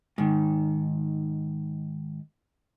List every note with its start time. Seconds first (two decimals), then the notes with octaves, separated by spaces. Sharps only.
0.18 G#2 D#3